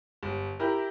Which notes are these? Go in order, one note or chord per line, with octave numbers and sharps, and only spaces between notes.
G1
E4 G4 A#4